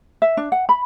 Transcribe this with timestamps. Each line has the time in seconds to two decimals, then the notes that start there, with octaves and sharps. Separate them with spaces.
0.22 E5
0.37 D4
0.52 F#5
0.69 B5